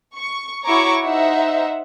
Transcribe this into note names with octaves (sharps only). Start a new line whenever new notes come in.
C#6
E4 F#4 C#5 A#5 C#6 D6
D#4 C5 E5 F#5